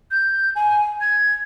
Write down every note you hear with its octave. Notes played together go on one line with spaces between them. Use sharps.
G6
G#5
G#6